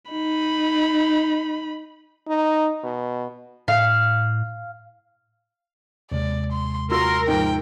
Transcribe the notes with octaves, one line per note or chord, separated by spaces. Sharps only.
D#4 B5
D#4
B2
A2 F5
D#2 C3 G#3 D5
C6
F4 F#4 A#4 C6 E6
G#2 F3 G5